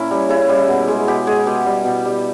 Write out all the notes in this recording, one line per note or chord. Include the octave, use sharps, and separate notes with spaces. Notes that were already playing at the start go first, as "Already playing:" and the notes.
Already playing: A#2 C#4 E4 A#4
G3
C#3 E4
G3
B2
G#3
B2 G4
G#3 G#4
B2 G4
G3
B2
G3